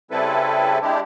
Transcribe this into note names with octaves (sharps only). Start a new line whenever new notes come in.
C#3 G3 C4 E4 A4 B4
G#3 D4 E4 G4